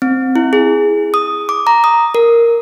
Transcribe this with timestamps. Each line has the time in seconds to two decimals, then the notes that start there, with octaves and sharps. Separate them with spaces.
0.02 C4
0.36 E4
0.53 G#4
1.14 D#6
1.49 D6
1.67 A#5
1.84 D#6
2.15 A#4